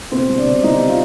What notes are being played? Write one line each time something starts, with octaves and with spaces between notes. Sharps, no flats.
B2 C4 C5
G3
D4 D5
B2
G3 D#4 D#5
B2 E5
F4 F5